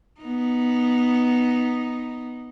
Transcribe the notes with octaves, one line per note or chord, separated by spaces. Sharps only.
B3 D#4